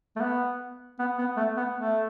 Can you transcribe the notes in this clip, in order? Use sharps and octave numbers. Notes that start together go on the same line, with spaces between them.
A3
B3
B3
B3
A3
B3
A3